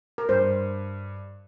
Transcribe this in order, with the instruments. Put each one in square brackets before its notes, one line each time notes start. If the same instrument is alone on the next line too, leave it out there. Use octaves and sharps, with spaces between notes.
[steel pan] A#4
[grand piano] G2 [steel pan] C5